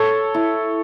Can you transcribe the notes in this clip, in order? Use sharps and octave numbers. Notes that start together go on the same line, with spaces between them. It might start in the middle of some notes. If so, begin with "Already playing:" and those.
Already playing: A4 C#5
E4